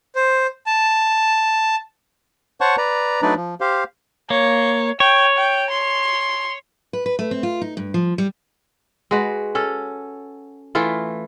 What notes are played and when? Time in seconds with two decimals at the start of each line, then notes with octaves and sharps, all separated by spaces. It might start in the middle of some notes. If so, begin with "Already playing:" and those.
0.15 C5
0.66 A5
2.61 C5 C#5 F#5 A5 C#6
2.77 B4 D5 A#5
3.22 F#3 A3 D4 D#4 B4 D5
3.36 F3
3.60 G4 C5 F5
4.30 A#3 C#5
5.00 C#5 G5
5.37 G5
5.70 C6
6.93 B4
7.06 B4
7.19 A3
7.31 C4
7.43 F4
7.61 D#4
7.77 G2
7.94 F3
8.18 G3
9.11 G#3 F#4 B4
9.55 C#4 A4
10.75 E3 A3 F4